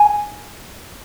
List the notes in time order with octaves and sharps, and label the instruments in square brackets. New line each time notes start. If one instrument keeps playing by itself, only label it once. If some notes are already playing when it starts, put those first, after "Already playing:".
Already playing: [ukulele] G#5